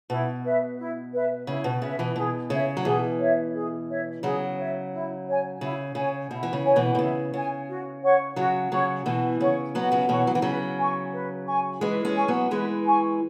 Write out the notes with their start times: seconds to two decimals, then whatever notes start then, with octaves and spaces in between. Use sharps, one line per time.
0.09 B2 E4
0.44 B4 E5
0.78 E4
1.13 B4 E5
1.47 C#3 E4
1.64 B2
1.82 C#3 B4 E5
1.99 B2 E3
2.16 B2 G#4
2.50 C#3 C#5 E5
2.77 F#3
2.85 B2 E3 G#4
3.19 C#5 E5
3.54 G#4
3.88 C#5 E5
4.23 C#3 F#3 G#4
4.57 C#5 E5
4.92 E4
5.27 C#5 G#5
5.61 C#3 E4
5.95 C#3 C#5 G#5
6.30 B2 E4
6.43 E3
6.53 C#3
6.65 C#5 G#5
6.76 B2 E3
6.95 B2
6.99 C#3 E4
7.33 C#3 C#5 G#5
7.68 F#4
8.03 C#5 F#5 C#6
8.36 C#3 F#3 F#4
8.72 C#3 F#3 C#5 F#5 C#6
9.06 B2 E3 F#4
9.40 C#3 C#5 F#5 C#6
9.75 F#3 B3 F#4
9.92 C#3 F#3
10.09 B2 E3 C#5 F#5 C#6
10.27 F#3
10.35 E3
10.42 C#3 F#3 B4
10.78 G#5 C#6
11.13 B4
11.47 G#5 C#6
11.81 E3 G#3 B4
12.05 G#3 C#4
12.17 G#5 C#6
12.28 F#3 B3
12.51 E3 G#3 B4
12.86 G#5 C#6